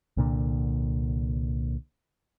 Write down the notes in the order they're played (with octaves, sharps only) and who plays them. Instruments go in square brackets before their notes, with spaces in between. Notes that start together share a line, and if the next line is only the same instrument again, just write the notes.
[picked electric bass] C2 A#2 D3